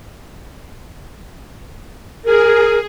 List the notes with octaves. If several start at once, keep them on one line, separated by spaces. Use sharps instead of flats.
G#4 A#4